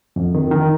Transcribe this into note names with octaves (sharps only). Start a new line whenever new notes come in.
F2
D#3
D#3